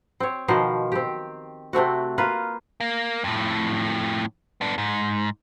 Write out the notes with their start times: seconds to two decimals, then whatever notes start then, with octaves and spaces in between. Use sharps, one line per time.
0.20 C4 C#5
0.48 B2 D#3 F3 C5
0.92 C4 G4
1.73 C3 A3 C4 F#4
2.18 A#3 F4 B4
2.80 A#3
3.24 F2 A2
4.61 B3 D4
4.78 G#2